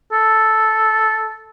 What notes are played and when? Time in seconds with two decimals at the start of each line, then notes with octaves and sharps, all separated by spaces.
0.12 A4